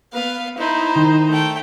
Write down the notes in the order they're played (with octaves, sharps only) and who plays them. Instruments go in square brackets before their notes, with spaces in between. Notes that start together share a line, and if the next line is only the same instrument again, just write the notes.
[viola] B3 B4 [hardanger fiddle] F5
[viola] D#4 C5 [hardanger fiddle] E4
[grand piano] D#3
[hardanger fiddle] A3 G5